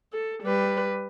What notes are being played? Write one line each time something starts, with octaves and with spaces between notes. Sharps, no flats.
A4
G3 B4